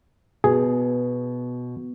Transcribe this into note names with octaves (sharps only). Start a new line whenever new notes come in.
B2 G#4